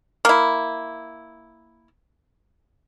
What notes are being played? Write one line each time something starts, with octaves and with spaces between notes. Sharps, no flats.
A#3 E4